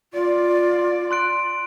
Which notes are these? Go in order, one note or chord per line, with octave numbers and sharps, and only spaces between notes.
F4 D5
C6 F#6 D7